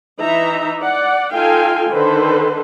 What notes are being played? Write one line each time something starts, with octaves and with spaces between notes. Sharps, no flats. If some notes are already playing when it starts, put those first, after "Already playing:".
E3 D#4 E5 A#5
D5 F#5
D#4 F4 A4 F5 G5 G#5
D3 D#3 A4 B4 C5